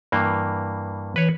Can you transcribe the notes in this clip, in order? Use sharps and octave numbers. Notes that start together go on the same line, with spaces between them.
G2 E3 A#3
E3 B4 C#5